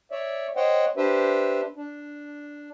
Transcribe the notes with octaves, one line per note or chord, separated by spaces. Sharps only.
C#5 D5 E5
C5 C#5 D#5 F#5 G5
D4 G4 B4 C5 E5
D4